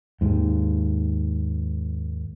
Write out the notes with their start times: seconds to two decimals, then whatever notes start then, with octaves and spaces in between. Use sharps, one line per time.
0.21 D#2 G#2